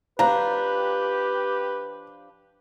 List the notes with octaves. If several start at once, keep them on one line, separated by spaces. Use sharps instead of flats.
F3 D4 G4 B4 A#5